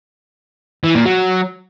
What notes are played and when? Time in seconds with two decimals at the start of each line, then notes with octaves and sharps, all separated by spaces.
0.84 E3
0.95 A#2
1.06 F#3